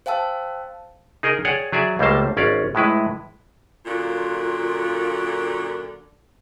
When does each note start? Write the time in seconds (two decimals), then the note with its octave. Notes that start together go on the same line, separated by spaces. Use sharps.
0.06 C5 F5 G5 A5 E6
1.23 D#4 G#4 A#4 D#5
1.45 G#4 C#5 D5 F#5 G5
1.72 F#3 G#4 D5 E5
1.99 C#2 G3 A3 A#3 C5 A5
2.37 G#1 C#4 D5 F5
2.75 A2 G#3 E4 B4
3.85 F#2 A#2 D3 F4